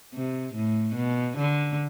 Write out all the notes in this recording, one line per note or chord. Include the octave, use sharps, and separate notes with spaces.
C3
A2
B2
D3